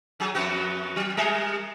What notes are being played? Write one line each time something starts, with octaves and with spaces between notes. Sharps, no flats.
F#3 G#4
F2 B3 F#4
F#3
G3 G#4 A#4